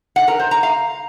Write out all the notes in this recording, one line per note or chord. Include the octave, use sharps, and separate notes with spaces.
F#5
A#4
C5
A#5
F5